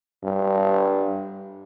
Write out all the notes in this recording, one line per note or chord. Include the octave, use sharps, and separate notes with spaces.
G2